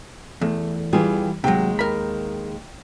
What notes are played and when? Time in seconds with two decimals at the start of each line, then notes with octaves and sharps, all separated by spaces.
0.41 E2 A3
0.93 E3 G3 F4 G4 G#4
1.44 D#2 C3 F#3 G#3 G5
1.79 A#4 B5